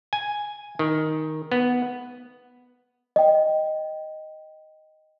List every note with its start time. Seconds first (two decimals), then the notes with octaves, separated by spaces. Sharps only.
0.13 G#5
0.79 D#3
1.52 B3
3.16 D#5 G5